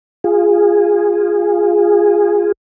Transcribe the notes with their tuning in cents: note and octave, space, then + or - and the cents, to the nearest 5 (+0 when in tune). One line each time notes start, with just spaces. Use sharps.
F4 +0 G#4 -15